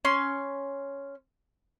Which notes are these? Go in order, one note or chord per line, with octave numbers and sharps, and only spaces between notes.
C#4 C6